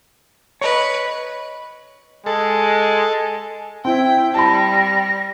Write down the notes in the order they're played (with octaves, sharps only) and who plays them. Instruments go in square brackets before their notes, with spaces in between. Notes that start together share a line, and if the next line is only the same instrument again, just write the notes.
[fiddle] B4 [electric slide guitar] C#5 D#5
[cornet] G#3 [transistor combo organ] A4
[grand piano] C4 [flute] E4 [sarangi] G5
[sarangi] G3 [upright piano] A5 B5 [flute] A#6